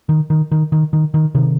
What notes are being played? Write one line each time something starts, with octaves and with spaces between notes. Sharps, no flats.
D#3
D#3
D#3
D#3
D#3
D#3
C3 D#3